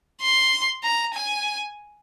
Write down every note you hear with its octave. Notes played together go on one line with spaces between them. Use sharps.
C6
A#5
G#5